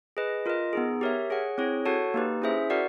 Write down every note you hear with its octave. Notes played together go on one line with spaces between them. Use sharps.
G#4 B4 D#5
F4 A#4 D#5
B3 D#4 G#4
G4 A#4 C#5 E5
G#4 C#5 F#5
C4 E4 G#4 C#5
F#4 A4 C#5 F#5 A5
A#3 D#4 G4 B4
C#4 E4 G#4 C5 E5
F#4 A#4 D5 F#5